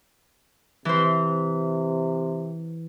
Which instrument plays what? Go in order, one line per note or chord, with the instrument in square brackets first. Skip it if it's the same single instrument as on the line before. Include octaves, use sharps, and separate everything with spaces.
[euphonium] C3 [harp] E3 C5